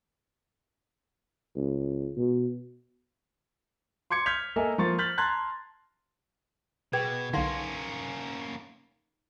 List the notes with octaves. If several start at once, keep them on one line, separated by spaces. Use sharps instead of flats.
C#2
B2
C6 D6 G#6 C#7
F6 G6 G#6 B6 F7
A#3 A4 A#4 D#5 E5 G#5
F3 A#3 C6 C#6 A6
F6 G6 A6 B6 F#7
A5 A#5 C6 F#6 G#6 A6
B2 G#4 B4 G5 G#6
B1 D3 A#3 C#4 D#4 F5 C6